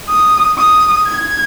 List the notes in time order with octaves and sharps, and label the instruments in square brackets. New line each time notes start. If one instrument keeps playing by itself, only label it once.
[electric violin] D#6
D#6
G#6